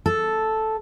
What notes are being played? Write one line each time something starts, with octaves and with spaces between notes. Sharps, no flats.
A4